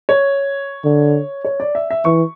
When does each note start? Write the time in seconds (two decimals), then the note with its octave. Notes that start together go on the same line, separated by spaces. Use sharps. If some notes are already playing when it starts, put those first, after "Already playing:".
0.09 C#5
0.85 D3
1.45 C#5
1.60 D5
1.75 E5
1.90 E5
2.05 E3 C#6